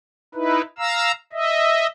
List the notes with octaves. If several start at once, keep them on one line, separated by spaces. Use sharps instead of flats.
D#4 E4 B4
F5 A#5 E6
D#5 E5